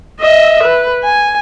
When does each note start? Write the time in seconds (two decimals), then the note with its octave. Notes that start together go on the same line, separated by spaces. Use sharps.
0.20 D#5 E5
0.64 B4
1.04 G#5